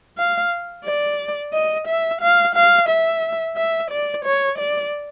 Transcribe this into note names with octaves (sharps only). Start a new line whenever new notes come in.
F5
D5
D#5
E5
F5
F5
E5
E5
D5
C#5
D5